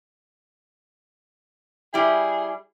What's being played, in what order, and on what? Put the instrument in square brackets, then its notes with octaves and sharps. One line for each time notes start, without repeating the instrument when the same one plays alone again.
[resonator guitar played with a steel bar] G3 E4 [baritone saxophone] G#4